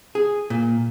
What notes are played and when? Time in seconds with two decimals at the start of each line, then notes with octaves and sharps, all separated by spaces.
0.15 G#4
0.50 A#2